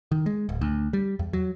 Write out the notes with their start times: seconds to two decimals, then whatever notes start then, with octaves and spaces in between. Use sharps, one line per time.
0.12 D#3
0.26 G#3
0.49 D1
0.61 D2
0.93 G3
1.19 E2
1.33 F#3